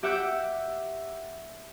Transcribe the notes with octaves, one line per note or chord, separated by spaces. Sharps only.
G4 E5 F#5 D6 E6 G6